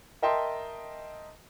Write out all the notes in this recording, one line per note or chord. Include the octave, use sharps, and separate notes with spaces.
A#4 D#5 E5 G5 A5 C6